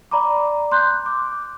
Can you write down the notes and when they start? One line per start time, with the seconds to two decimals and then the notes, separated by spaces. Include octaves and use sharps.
0.11 D5 A#5 B5 D6
0.72 C6 F#6 G6
1.06 D6